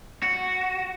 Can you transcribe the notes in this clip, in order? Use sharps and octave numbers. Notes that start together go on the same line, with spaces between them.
F#4